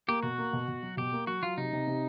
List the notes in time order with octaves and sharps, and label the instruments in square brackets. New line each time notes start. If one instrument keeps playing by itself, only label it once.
[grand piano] A#3 [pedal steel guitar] G4
[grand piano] B2 [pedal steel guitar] F#4
[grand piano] A#3
B2
B2
F#3
[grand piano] B2 [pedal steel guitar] G4
[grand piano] A#3
[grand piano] F#3 [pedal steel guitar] F#4
[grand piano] F#3 [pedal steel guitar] F4
[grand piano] C3 [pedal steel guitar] D#4
[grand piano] C3
C3